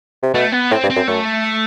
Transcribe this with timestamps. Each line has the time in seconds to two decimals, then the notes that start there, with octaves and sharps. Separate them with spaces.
0.23 C3
0.34 B2 A3
0.52 B3
0.71 A2 C4
0.83 G2
0.90 C4
0.96 F#2
1.08 F#2 A3